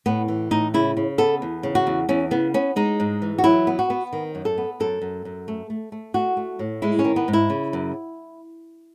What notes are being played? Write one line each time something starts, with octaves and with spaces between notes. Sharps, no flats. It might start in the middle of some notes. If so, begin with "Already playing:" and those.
A2 B3
E3
A2 D#4
C#3 E4
C#3
B3 A4
E2
C#3
F#4
E2
E2 C#4
C#3 B3
B3 C#4
G#3 D#4
G#2
E3
F#4
F#3 E4
B3
F#4
B3
D#3
F#2
A4
B3
F#2 A4
F#2
F#2
A3
A3
A3
A3 F#4
A3
A2
G#3 E4
C#4
D#3
B3
G#2
E4
C#3
F#2